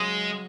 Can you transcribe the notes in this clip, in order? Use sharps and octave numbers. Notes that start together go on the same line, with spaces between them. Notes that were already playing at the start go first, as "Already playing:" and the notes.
Already playing: C#3 F#3 G#3 C#4